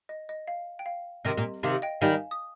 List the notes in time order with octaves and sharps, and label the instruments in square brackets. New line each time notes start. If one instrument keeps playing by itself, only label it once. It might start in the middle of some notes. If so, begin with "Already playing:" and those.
[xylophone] D#5
D#5
F5
G5
F5
[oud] C3 D#3 [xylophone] D#5
[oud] A#2
[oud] C3 D#3 [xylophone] F5
[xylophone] D#5 G5
[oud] D#3 G3 [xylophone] F5 G#5
[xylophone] D#6